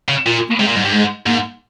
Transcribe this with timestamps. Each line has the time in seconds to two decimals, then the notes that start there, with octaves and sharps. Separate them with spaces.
0.09 C#3
0.25 A#2 F4
0.37 F4
0.49 A#3
0.59 C3 G#3
0.68 A#2
0.75 G#2 G3
0.85 G2
0.92 G#2 G#3
1.26 G#2 A#3